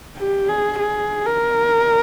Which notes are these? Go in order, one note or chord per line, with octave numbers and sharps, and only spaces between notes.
G4
G#4
G#4
A#4